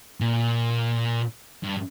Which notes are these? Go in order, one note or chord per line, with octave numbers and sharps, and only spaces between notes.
A#2
G2